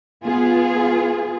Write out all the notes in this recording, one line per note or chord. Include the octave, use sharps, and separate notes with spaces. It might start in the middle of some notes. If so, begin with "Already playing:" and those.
B3 F4 G#4